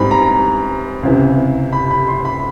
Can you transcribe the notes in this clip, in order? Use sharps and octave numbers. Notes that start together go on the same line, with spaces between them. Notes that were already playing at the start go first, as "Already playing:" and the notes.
Already playing: G#2 E3 G3 C4 B5
A#5
C#2 C3 E3
B5
B5
C6
B5